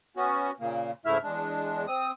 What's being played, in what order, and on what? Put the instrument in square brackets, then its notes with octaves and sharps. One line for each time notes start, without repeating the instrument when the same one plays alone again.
[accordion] B3 C#4 F#4
A#2 C#3 A#3
G#2 C#3 A3 E4 E5 F6
E2 G#3 D4
C4 D#6